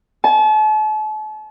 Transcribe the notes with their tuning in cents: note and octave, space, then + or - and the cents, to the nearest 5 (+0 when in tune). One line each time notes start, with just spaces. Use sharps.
A5 -40